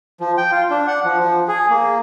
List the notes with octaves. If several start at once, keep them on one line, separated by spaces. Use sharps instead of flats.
F3
G5
F4
D4
F#5
F3
F3
G#4
A#3